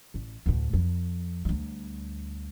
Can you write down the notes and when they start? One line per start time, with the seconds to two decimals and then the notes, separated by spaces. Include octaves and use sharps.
0.14 A1
0.46 D2 A2
0.73 F2
1.45 D2 G3